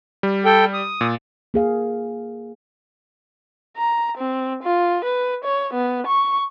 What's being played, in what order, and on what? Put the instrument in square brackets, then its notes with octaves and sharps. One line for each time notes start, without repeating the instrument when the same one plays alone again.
[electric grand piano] G3
[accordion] A4 G5
D#6
[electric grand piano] A#2
[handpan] A#3 G#4 F5
[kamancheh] A#5
C4
F4
B4
C#5
B3
C#6